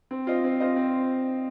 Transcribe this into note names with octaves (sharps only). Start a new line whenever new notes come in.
C4
F4 C5 D#5
C4
F4 C5 D#5
C4